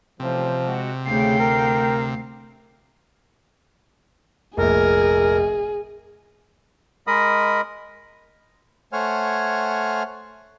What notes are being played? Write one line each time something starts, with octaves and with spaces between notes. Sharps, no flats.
A1 A2 C3 F3 G3
G#3 F#4
D2 C#3 A3 F5 G5
A#4
F1 A#1 G#4 A#4
G#3 A#4 D#5 B5 D#6
A3 C5 C#5 F#5 G#5 F6